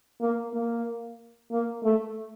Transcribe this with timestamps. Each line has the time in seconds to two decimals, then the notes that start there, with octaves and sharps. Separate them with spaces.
0.21 A#3
0.54 A#3
1.51 A#3
1.83 A3